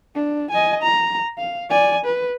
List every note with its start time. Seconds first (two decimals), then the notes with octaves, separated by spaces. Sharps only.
0.15 D4
0.51 D#5 G#5
0.83 A#5
1.38 F5
1.70 D5 G#5
2.05 B4